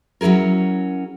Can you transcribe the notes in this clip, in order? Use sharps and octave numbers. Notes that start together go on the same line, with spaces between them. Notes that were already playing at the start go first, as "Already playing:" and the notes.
F#3 C#4 E4 G#4 A#4